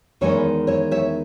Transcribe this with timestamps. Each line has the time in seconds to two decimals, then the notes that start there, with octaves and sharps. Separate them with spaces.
0.21 E2 D#3 G#3 B3 C#5 E5
0.67 C#5 E5
0.91 C#5 E5